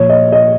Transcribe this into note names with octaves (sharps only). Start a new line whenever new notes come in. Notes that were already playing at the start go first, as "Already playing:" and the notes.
Already playing: A#2 F3 C#5
D#5
D#5